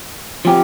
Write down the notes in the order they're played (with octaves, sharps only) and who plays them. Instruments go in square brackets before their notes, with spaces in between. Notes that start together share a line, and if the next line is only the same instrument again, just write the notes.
[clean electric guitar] F3 C4 G4